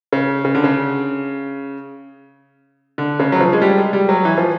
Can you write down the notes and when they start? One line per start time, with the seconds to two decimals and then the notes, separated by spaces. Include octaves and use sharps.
0.12 C#3
0.45 C#3
0.55 D3
0.64 C#3
2.98 D3
3.19 C#3
3.32 F#3
3.41 F3
3.53 G#3
3.61 G3
3.78 G#3
3.93 G3
4.09 F#3
4.25 E3
4.38 F3